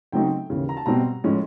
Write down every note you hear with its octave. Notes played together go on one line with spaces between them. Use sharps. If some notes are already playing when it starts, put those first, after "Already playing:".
C#3 F#3 A3 C4 D#4 G5
D#2 C#3 E3
A#5
A5
B2 G3 C4 A#5
A2 F3 G#3 C#4